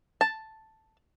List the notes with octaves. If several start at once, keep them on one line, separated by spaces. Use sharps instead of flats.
A5